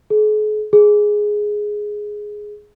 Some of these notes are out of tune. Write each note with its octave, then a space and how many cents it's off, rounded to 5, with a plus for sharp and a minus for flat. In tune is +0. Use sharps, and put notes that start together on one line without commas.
G#4 +45
G#4 +5